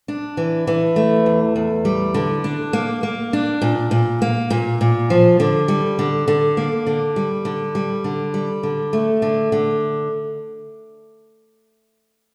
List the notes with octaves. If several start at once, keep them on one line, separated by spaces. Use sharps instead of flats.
D4
E3
E3
A3
E2
E2
G3
D3
D4
A#3
A#3
D4
A#2
A#2
A#3
A#2
A#2
F3
D3
G3
D3
D3
A#3
D3
G3
D3
G3
D3
G3
D3
A3
D3
D3